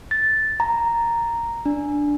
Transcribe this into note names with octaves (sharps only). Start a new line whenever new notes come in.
A6
A#5
D4